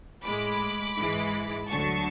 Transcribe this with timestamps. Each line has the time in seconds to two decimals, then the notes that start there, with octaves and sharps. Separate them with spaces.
0.24 A2 G#3 B5 D6
0.96 G#2 E3 G#3
1.68 D2 D3 F#3 A5 C#6